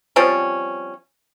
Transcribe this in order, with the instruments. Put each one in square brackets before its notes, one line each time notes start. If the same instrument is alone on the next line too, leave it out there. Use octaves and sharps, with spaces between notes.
[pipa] F3 G3 C4 C#4